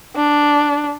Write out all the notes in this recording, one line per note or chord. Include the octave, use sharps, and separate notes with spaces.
D4